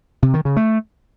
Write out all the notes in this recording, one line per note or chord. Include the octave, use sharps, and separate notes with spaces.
C3
D#3
C#3
A3